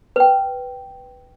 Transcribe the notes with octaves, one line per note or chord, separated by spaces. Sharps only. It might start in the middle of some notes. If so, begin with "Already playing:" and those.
B4 G5